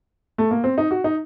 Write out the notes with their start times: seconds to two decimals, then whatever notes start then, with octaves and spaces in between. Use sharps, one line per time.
0.38 A3
0.51 A#3
0.64 C4
0.78 D#4
0.91 F#4
1.04 D#4